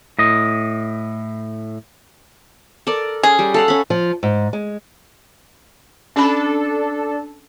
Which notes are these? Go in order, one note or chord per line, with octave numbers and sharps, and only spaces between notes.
A2 D#5
A4 A#4 D5
C#4 G#4
G3
A4 F5 F#5
C#4 B5
F3
G#2
G#3
C#4 D4 A4 B5